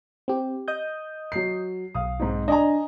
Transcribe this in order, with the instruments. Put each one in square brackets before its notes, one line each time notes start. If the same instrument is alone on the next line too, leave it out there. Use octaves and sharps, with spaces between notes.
[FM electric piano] C4 G4
D#5 D#6 G6
[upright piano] F#3 C7
[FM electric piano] B1 [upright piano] F5 D#6
[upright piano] G#2 C4 D#4
[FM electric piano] D4 [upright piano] D#5 G#5 A#5